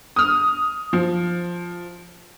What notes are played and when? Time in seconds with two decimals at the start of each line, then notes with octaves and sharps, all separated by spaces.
0.16 D#6 F6
0.93 F3